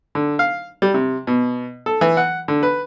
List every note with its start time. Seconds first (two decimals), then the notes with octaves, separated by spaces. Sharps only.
0.15 D3
0.39 F5
0.82 G3
0.94 C3
1.27 B2
1.86 A4
2.01 E3
2.17 F#5
2.48 D3
2.63 B4